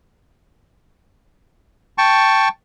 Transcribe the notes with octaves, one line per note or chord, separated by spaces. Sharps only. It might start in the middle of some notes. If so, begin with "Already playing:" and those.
G5 A5 C#6